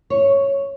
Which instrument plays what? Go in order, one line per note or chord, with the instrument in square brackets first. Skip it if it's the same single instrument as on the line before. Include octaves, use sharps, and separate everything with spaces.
[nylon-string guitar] C#5